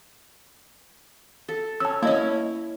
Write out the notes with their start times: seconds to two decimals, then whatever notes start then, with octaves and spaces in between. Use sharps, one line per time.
1.48 A4
1.80 C#4 A5 E6
2.03 A#3 C#4 E4 D#5